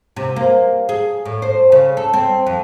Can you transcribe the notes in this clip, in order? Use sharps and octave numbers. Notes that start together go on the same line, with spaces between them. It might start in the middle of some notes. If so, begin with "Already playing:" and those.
C3
A#3
G#4
A2
C5
C#3
A4
C4
F2